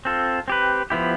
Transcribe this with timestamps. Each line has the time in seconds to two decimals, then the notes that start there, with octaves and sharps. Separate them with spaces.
0.05 C4 F4 A4
0.48 C4 G4 B4
0.90 F3 B3 E4 G4